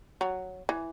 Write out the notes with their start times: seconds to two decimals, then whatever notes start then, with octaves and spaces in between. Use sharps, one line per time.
0.21 F#3
0.69 E3